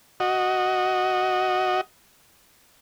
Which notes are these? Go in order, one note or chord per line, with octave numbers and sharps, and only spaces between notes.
F#4 D#5